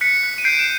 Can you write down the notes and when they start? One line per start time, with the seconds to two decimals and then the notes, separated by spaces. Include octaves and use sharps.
0.01 F#6 B6 C#7
0.23 F#6
0.38 D#7
0.44 G6 C7 D7
0.59 E7